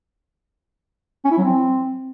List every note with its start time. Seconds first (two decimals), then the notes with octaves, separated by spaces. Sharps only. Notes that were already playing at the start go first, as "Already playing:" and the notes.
1.25 C#4
1.31 E4
1.38 F#3
1.44 C4